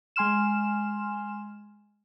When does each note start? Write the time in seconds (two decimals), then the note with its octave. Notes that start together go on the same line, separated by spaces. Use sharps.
0.16 G#3 G#5 C6 F6 E7